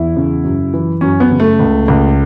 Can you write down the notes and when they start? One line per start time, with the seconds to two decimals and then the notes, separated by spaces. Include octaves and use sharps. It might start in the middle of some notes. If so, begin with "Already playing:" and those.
Already playing: E2 E4
0.16 C#3
0.44 F#2
0.74 E3
1.01 F#2 C#4
1.20 B3
1.31 C#3
1.40 A3
1.59 C#2
1.88 C#2